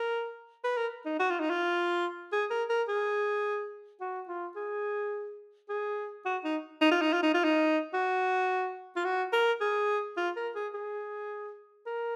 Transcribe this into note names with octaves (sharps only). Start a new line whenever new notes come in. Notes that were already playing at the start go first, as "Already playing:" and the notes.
Already playing: A#4
B4
A#4
D#4
F#4
F4
D#4
F4
G#4
A#4
A#4
G#4
F#4
F4
G#4
G#4
F#4
D#4
D#4
F4
D#4
F4
D#4
F4
D#4
F#4
F4
F#4
A#4
G#4
F4
A#4
G#4
G#4
A#4